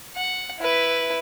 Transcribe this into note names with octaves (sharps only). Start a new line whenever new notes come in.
F#5
E4 B4